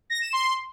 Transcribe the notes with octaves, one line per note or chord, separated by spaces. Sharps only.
A#6
E7
C6